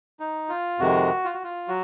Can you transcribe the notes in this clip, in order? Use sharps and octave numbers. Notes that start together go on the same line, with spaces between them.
D#4
F4
F2 C3 D#3 G#3 F#4
F4
F#4
F4
F#3 F#4